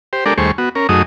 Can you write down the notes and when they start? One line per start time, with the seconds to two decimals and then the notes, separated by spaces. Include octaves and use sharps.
0.13 G4 C5
0.26 G#3 D4 G4 A4 A#4 D5
0.38 D#2 G3 A3 G#4 C5 C#6
0.58 B3 F#4
0.75 C#4 A#4
0.89 F#2 F#3 A3 D#4 G#4 D#6